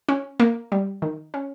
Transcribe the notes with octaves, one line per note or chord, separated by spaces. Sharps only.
C#4
A#3
G3
D#3
C#4